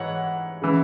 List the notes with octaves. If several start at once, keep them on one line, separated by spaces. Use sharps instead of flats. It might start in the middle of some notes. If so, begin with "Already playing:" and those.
Already playing: G#2 E3 C#5 F#5
C#3 E3